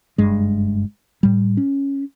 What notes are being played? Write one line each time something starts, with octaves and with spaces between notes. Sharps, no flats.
F#1 G2 G#3
A2 G3
C#4